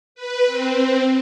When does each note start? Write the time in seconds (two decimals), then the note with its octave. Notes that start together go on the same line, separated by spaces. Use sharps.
0.15 B4
0.46 C4